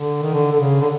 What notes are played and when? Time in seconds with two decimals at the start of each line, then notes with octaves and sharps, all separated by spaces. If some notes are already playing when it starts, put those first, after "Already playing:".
Already playing: D3
0.22 D#3
0.34 D3
0.52 D3
0.60 C#3
0.81 D3